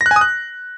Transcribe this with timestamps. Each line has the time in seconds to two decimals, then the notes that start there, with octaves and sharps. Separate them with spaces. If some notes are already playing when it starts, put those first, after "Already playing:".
0.01 A#6
0.06 F#6
0.11 G#5
0.16 D#6
0.21 F#6